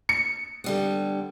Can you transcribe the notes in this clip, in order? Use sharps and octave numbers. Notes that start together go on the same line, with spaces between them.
C#7
D3 G3 B3